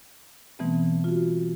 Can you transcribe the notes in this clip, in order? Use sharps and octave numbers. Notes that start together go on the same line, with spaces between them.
B2 E3 G3 A3 B3 C4
F4 F#4